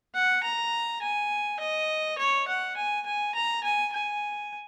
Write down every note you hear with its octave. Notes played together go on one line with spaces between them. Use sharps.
F#5
A#5
G#5
D#5
C#5
F#5
G#5
G#5
A#5
G#5
G#5